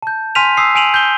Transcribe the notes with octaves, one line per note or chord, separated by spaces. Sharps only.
A5 G6
G#5 C6 F6 B6 D#7 F7
D#6 E6 C7
G#5 D7 D#7 F7 F#7
G6 G7